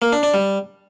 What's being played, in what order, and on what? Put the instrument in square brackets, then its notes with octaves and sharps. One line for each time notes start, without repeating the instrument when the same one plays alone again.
[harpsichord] A#3
D4
D4
G3